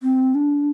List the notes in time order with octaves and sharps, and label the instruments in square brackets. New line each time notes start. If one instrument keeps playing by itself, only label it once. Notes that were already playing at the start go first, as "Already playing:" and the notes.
[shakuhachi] C4
D4